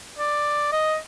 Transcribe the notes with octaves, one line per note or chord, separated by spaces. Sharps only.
D5
D#5